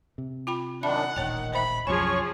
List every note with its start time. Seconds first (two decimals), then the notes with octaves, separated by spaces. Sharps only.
0.18 C3
0.47 F4 G5 B5
0.83 F#2 D#3 D4 E5 F#5 B5
1.16 D#1 A1 D#3 C#5 G5
1.54 C5 E5 B5
1.87 C2 F#2 F3 G#4 C#5 G#5 C#6